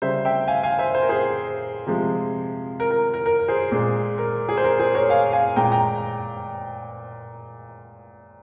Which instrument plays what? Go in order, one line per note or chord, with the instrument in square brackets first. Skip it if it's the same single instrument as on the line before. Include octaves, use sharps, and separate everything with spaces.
[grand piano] C#3 G3 C5 E5
E5 G5
F5 G#5
F5 G#5
C5 E5
C5
A#4
G#4 C5
C3 F3 G#3
A#4
A#4
A#4
A#4
G#4 C5
A#2 G#3
A#4
G#4
C5
A#4
G#4 C5
A#4 C#5
F5 G#5
F5 G#5
A#2 G#3 G5 A#5
G5 A#5